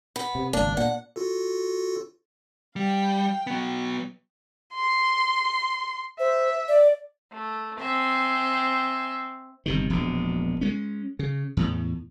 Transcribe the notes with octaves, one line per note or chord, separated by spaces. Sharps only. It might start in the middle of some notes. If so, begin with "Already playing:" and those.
B3
C3
G#1 C#2 A#3 D4
A#2 A#3 F#5
F4 F#4 A4
G3 F5 G5
F#3 B3
C6
C5 E5
D5
A3
C4 E5 G#5
G1 C3 D#3
E1 A#1 B2
G#3 A3 C#4
C#3
E2 A2